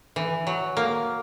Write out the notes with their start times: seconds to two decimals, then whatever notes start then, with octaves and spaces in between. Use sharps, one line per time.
0.16 E3
0.47 F#3
0.77 A#3